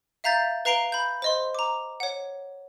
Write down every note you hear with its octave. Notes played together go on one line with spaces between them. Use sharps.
E5 F5 A#5 G6 A6
B4 F5 A#5 C7 D7 G7
B5 G6
C5 D#5 C6
A#5 D6
C#5 F#5